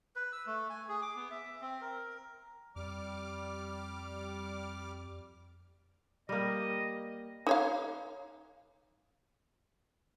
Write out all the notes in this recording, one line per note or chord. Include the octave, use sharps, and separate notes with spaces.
B4
E6
A3
G#5
G#4
D6
B3
E5
C4
A#4
F2 G3 D6 F6
G3 A#3 D#5
D#4 C#5 F5